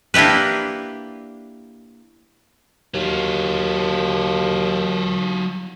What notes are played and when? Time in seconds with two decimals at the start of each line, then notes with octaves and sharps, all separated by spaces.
0.14 A#3 D4 E4 G4 B4
2.94 D#2 F#3 F4